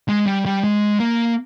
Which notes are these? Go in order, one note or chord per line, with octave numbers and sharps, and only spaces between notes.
G#3
G3
G3
G#3
A#3